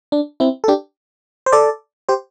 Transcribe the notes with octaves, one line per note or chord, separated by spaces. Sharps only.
D4
C4 E4
A4
D4 G4
C5
A4 D5
G4 C5